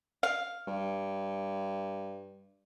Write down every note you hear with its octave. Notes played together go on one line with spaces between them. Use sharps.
F5
G2